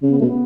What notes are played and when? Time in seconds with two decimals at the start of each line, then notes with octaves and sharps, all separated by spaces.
0.03 C#3 C#4
0.10 B3
0.18 A3
0.21 B2
0.27 B3